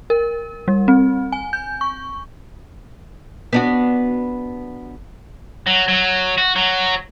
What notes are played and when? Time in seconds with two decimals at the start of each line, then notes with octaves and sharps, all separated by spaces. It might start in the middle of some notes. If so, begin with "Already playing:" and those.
0.10 A#4
0.68 G3
0.88 C4
1.32 G#5
1.53 G6
1.81 C#6
3.53 B3 D4 F#4
5.67 F#3
5.88 F#3
6.38 F#4
6.56 F#3